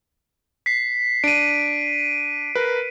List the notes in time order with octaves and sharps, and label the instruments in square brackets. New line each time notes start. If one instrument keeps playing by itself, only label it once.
[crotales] B6 C7
[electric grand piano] D4 [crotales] D7 D#7
[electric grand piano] A#4 B4